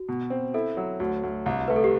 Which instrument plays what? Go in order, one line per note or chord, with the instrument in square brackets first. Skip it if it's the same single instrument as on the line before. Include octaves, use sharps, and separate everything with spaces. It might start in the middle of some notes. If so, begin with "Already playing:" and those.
Already playing: [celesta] F#4
[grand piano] B2
C4
[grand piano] E4 [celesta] A4
[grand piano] F#3
[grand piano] D2 [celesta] F#4
[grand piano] D2
C2
[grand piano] A3 [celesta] B4
[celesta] A4
G4